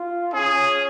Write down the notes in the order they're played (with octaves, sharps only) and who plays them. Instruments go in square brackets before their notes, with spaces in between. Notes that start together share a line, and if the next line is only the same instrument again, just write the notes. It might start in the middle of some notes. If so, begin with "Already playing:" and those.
Already playing: [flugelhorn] F4
[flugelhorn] C#4 [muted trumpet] G#4